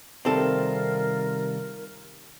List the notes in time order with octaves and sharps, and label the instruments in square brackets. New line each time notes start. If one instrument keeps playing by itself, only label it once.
[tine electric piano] C3 D#3 G3 [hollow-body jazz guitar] C4 A4 [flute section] D#4 F4 A#4